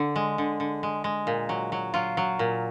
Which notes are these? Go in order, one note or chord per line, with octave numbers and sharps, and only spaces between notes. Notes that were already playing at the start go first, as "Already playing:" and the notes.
Already playing: D3
G#3
D3
D3
G#3
G#3
A#2
F#3
F#3
F#3 F4
F#3
A#2